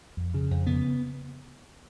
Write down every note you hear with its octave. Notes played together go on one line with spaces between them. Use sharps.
F2
C#3
F2
C#3 B3